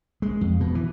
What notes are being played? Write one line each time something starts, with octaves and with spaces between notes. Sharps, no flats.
G#3
F2
B2
E3